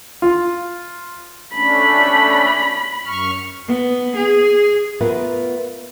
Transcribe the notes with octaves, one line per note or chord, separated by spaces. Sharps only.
F4
A3 C#4 D4 B5
F#2 C#6 F6
B3
G#4
A3 B3 F4 A#4 B4 F#5